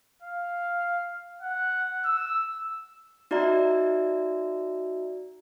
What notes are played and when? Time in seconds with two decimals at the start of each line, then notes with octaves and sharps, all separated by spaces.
0.23 F5
1.42 F#5
2.05 E6
3.31 D#4 F#4 D5 E5 A#5